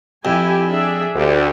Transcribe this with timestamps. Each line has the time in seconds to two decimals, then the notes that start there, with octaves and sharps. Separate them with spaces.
0.25 F2 E4 G4 G#5
0.69 D4 G#4 E5
1.15 D2 G4